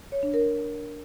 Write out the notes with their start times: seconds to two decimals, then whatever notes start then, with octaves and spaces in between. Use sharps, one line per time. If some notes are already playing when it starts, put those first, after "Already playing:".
0.12 C#5
0.23 D4
0.34 A#4